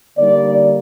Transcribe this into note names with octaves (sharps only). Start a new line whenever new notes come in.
D3 G3 A#3 D#4 D5